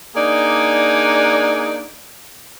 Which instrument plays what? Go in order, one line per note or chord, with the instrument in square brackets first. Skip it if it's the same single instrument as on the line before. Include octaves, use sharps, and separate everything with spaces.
[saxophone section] A#3 D4 D#4 G#4 D5